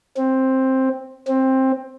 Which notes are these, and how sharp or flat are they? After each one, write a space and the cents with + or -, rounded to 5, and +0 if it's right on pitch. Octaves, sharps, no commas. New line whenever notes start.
C4 +10
C4 +15